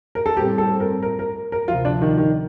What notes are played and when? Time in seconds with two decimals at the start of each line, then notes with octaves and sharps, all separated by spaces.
0.15 A#4
0.26 A4
0.37 A2 G3 C4 G4
0.58 A4
0.80 A#4
1.03 A#4
1.19 A#4
1.52 A#4
1.68 D2 C3 F3 F4
1.85 D4
2.01 D#3
2.17 D#3